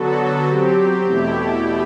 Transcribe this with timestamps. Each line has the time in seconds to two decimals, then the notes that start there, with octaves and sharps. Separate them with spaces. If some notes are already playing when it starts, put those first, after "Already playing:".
Already playing: D3 F#3 B3 F#4 A4
0.47 F#3 C4 G4
1.05 E2 B2 A3 E4 G4